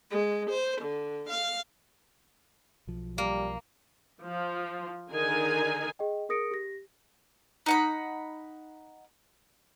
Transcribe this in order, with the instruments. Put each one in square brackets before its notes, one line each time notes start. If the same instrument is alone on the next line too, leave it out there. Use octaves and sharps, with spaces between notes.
[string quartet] G#3
C5
D3
F5
[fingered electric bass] B1 F3
[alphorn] G3 [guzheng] A#3
[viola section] F3
D3 D#3 D#4 G#4 A#4 G#5
[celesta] G#4 D#5 G5
G#4 A#4 D#6 A#6 C#7 D7
G4 A#6
[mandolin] D#4 F#5 B5